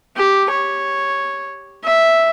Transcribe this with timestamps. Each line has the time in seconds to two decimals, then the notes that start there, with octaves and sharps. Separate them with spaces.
0.17 G4
0.50 C#5
1.84 E5